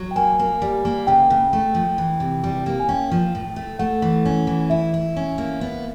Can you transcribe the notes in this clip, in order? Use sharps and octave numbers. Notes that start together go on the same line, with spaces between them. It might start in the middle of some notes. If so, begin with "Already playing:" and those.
Already playing: F#3
G5
A#3 G#5
A#3
G3
A#3
C#3 G5
C#3
A3
F3
E3
C3
G3
A#3
G#5
C#4 G5
F3
A2
A3
A3 F#5
E3
C#4
E3
E4 E5
E4
C#4
A#3
B3